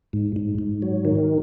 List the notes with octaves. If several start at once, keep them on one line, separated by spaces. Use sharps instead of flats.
G#2
G#2
G#2
F#3
D#3